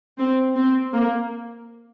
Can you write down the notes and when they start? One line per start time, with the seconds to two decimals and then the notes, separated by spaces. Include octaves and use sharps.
0.18 C4
0.56 C4
0.93 A#3